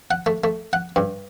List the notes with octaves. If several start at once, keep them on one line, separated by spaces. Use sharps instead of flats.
F#5
A3
A3
F#5
G2